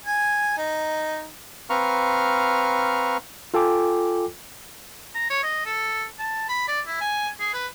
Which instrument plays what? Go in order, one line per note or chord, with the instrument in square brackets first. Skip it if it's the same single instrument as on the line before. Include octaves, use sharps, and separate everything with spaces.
[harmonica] G#5
D#4
[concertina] C4 B4 F5 A#5 C#6 F6
[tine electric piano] F4 A4 G5 G#5 D6
[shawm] A#5
C#5
D#5
A4
A5
B5
D5
E4
G#5
G#4
B4